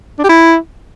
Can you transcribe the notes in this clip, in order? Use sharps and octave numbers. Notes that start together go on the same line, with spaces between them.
D4
G4
E4